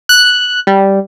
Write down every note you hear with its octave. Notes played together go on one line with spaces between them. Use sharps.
F#6
G3